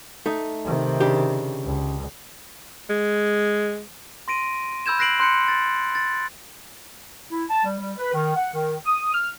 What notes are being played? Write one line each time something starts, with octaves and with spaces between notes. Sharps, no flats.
A3 D#4
C3 D#3
C#3 D4 G4
C#2
G#3
C6 A#6 D7 D#7
B5 E6 G6 G#6 E7
F#6 A#6 C7 D7 F#7
C6 F#6 G6 C#7
A6
A6
E4
A5
G3
G3
B4
D#3
F#5
D#3
D#6
F6